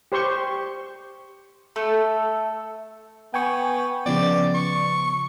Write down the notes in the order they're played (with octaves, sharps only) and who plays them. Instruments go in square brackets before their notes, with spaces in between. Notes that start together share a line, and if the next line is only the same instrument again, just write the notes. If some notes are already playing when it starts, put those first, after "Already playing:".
[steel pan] G4 C5 C6 C#6
[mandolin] A3 A4
[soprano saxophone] B3 [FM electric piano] G5 G#5 C#6
[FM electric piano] C#3 F3 B3 [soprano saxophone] D5
[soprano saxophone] C#6